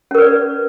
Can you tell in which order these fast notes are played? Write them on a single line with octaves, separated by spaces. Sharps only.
C#4 A#4 B4 D5